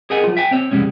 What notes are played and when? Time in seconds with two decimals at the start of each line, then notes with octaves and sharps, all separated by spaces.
0.10 G#4 A#4 D#5 F#5 G#5
0.24 F#3 F4
0.37 E5 G5 G#5
0.51 C4 C#5 E5
0.71 C2 F2 A#2 G3 G#3 C#4